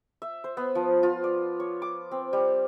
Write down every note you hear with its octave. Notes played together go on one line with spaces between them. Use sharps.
E5
C5
B3
F3
F4
D5
C#5
D6
C4
G3